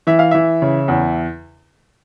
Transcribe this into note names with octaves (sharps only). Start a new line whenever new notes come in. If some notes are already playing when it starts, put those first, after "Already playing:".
E3 E5
F5
E3 E5
C#3
E2